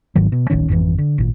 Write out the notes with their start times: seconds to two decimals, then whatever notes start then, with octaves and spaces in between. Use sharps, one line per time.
0.15 G1 G#2 D#3 F#3
0.32 B2
0.50 D1 A1 D#3 C#4
0.68 G#1 F2 D3 E3
0.98 D3
1.18 G#1 A#2